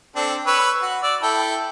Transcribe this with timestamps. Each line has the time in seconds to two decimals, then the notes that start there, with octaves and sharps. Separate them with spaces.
0.16 C4 D4 A4
0.47 B4 C#5 E6
0.82 F#4
1.03 D5 E6
1.23 E4 A4 G5